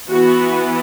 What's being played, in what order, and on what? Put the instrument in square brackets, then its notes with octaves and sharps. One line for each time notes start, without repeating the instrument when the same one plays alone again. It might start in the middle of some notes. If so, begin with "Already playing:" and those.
[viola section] E3 B3 F#4